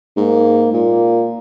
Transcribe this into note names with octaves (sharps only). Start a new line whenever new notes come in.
G#2 A#3
A#2 A#3